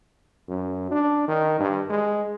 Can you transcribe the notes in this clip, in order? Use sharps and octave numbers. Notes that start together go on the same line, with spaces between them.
F#2
D4
D#3
G2
G#3